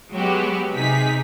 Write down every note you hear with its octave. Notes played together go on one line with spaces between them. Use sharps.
F#3 G#3 B3 F#4 G4
C3 D#4 G#4 B6